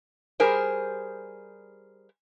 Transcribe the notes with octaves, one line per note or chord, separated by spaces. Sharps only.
G3 G4 G#4 A#4 C5